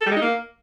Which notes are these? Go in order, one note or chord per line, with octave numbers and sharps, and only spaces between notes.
A4
G3
G#3
D#4
A#3